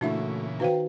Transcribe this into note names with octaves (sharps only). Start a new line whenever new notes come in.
A#2 C#3 E3 A3 D4 E4 F#4 E5
D#3 D#4 F#4 B4 C5 F5 G5